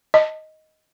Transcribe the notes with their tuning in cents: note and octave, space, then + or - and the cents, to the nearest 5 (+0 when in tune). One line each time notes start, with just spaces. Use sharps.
D#5 +5